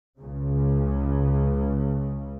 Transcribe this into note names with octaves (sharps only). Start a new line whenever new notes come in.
C#2 C#3